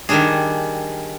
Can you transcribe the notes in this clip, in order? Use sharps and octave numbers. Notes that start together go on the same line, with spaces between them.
D#3 G3 D4 G#4